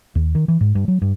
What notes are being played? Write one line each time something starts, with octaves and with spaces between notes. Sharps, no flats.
D#2
D#3
E3
G#2
G2
F#3
G2